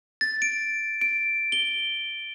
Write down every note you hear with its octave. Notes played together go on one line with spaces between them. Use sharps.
A6
D7
D7
G7